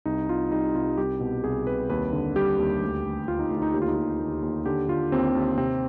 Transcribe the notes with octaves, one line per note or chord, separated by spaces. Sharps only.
C2 D#4
C2 F4
G3 D#4
C2 F4
C2 G4
B2
C2 G#4
C2 B4
D#2 B4
D3
G3 G4
D#2
D2
D2
D2 F4
D#4
D2
F4
D#4
D#2 G4
F4
D#4
D#2 F4
D#2
D#2
D3 G4
D3 F4
D#2 C4
D#2
C3 C4